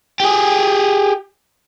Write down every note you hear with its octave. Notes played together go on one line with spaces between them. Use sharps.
G4 G#4